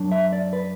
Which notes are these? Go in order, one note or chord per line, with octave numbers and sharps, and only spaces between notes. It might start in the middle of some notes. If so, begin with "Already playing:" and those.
Already playing: F#2 F#3 D4
E5
D5
B4